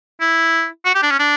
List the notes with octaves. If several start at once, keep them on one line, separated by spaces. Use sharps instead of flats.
E4
F#4
G4
D4
C#4
D4